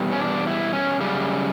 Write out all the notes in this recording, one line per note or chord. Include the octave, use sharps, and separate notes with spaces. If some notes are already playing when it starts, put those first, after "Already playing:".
Already playing: E2 B2 G3
C#4
D4
E4
C#4
F#2 C#3 G3